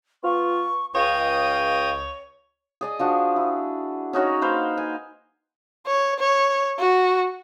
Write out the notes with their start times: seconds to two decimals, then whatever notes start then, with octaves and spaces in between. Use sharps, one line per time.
0.24 B3 F4 C#6
0.95 C#2 C#5 D#5 F5 G5 D#6
2.81 G#4 D5 D#5
2.99 F3 D4 F#4
3.36 E4
4.13 C#4 D#4 F#4 C#5
4.41 A#3 B4 C5 F5
4.77 G#5
5.87 C#5
6.19 C#5
6.79 F#4